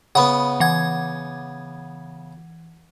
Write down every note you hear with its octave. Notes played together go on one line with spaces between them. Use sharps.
C#3 B3 F#5 B5
E3 F#5 G#6